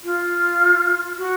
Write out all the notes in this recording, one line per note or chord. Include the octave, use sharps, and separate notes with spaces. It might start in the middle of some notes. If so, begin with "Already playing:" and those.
F4
F#4